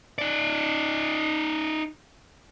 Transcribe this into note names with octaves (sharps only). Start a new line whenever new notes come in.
D#4 D5